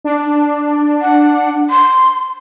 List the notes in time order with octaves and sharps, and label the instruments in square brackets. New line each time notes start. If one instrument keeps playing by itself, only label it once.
[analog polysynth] D4
[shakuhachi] F#5
C6